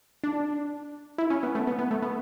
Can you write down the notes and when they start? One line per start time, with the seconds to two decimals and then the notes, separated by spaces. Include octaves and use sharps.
0.24 D4
1.18 E4
1.30 C#4
1.43 B3
1.55 A3
1.67 B3
1.79 B3
1.91 A3
2.02 B3